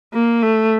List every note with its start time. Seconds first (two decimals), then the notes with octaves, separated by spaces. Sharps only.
0.13 A#3
0.43 A3